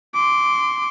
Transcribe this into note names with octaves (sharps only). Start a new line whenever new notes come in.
C6 D6